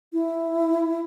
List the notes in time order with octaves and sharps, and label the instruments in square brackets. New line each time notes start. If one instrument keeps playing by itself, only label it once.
[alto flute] E4